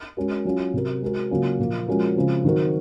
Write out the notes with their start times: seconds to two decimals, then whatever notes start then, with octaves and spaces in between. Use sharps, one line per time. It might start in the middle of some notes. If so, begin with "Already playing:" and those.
0.17 G#3 C#4 F#4 A#4
0.45 F#3 C#4 F4
0.74 C3 F#3 C4 F#4 A#4
1.02 G#3 C4 F#4 A#4
1.31 C#3 F#3 A#3 C#4 F4
1.59 A#2 F3 A#3
1.87 F3 G#3 C#4 F#4 A#4
2.16 C#3 F3 G#3 C4
2.44 D#3 F#3 C4 F#4 A#4